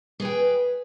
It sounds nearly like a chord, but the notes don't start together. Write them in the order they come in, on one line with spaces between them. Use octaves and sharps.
G#4 B4 G5